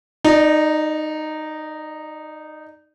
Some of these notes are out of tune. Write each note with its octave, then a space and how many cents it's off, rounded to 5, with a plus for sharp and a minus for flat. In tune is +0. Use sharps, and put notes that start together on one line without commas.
D#4 -10 D5 +20